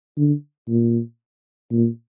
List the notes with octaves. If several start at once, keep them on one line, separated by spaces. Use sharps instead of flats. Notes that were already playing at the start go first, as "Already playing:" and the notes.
D3
A#2
A#2